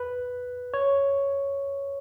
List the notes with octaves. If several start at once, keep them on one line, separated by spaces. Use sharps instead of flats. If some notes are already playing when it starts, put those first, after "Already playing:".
Already playing: B4
C#5